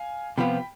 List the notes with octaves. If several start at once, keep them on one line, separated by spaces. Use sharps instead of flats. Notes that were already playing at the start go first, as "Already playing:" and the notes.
Already playing: F5 G#5
C3 F3 B3 F4 G5 B5